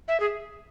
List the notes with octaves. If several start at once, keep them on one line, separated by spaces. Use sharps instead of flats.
E5
G#4